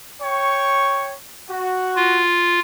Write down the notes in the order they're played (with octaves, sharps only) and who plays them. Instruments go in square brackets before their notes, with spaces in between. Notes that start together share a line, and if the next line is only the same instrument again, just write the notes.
[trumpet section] C#5 G5 C#6
F#4
[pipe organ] F4